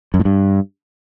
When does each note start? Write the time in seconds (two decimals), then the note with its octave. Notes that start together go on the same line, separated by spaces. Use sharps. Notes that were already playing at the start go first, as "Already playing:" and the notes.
0.14 F#2
0.20 A2
0.25 G2